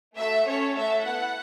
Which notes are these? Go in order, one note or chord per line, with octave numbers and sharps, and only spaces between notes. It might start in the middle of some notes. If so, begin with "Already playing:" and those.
A3 F#4 A4 E5
C#4 A4 C#5
A3 F#4 A4 E5
B3 E4 A4 F#5